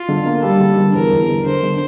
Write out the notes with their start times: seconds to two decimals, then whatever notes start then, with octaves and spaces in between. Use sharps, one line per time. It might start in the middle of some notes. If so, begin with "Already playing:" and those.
Already playing: F4
0.08 D3
0.26 A#3
0.43 G3 A4
0.60 D3
0.77 D3
0.94 E2 A#4
1.12 E2
1.29 D3
1.45 D3 C5
1.63 D3